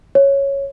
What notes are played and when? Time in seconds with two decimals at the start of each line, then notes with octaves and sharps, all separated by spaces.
0.15 C#5